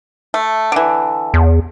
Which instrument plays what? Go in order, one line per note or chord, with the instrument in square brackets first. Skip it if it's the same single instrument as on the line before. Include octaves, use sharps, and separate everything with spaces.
[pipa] A3
D3 E3
[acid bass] E2